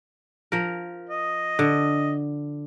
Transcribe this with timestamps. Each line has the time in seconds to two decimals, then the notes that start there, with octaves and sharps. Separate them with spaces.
0.52 F3 A#4
1.09 D#5
1.59 D3